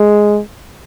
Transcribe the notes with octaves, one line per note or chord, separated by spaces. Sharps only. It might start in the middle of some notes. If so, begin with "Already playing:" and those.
Already playing: G#3